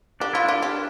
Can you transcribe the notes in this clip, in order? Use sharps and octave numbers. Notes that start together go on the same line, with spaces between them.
D4 G4
E4 F4
D4 F4
G4